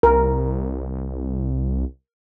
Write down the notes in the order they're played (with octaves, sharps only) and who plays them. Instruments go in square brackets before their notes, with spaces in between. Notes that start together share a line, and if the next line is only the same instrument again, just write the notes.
[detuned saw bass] C2 [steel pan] A#4